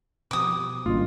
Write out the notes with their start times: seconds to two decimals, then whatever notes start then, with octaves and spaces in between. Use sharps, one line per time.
0.31 B2 F3 G4 D6 D#6
0.86 G#1 G2 A#3 C#4 F4 D#5